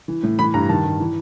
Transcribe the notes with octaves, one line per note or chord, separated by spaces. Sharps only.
E3
A2
E3 B5
G2 A#5
D#3 A5
G2
E3